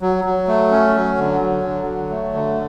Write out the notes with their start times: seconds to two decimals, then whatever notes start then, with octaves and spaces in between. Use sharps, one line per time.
0.01 F#3
0.25 F#3
0.48 A3
0.71 C#4
0.94 F#3
1.17 D3
1.41 F#3
1.63 D3
1.87 F#3
2.10 A3
2.33 D3